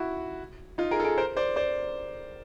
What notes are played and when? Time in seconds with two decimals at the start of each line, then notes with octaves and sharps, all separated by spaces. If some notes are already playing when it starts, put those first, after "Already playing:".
Already playing: E4 F#4
0.78 D#4 F4
0.91 G#4 A#4
1.00 A4
1.04 G#4 A#4
1.18 A#4 C5
1.37 C5 D5
1.56 C5 D5